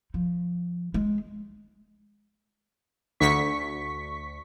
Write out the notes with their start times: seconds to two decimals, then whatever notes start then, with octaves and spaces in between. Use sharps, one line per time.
0.14 F3
0.94 G#3
3.20 D2 C#6 B6